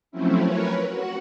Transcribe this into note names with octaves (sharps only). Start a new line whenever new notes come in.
F3 F#3 A3 C4 C#4 E4
A#4 B4 C#5
F#4 F#5